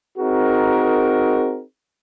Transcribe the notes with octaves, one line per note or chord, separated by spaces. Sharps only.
C4 D#4 F#4 G#4 A#4